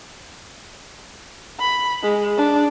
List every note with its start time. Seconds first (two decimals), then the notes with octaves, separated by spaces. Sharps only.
1.59 B5
2.03 G#3
2.37 D4